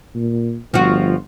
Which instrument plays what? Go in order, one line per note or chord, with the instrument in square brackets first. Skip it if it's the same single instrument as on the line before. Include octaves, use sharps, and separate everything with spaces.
[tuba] A#2
[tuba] G1 [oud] F3 F#4